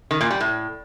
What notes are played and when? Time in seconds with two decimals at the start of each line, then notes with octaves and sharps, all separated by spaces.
0.11 D#3
0.21 A#2
0.31 G3
0.41 A2